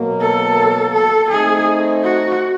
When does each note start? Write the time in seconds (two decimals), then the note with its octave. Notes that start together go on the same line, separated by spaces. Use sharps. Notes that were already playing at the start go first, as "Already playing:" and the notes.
Already playing: B2 F#3 A#3
0.21 A4
0.93 A4
1.30 A3 C4 D#4 G#4
2.03 F#4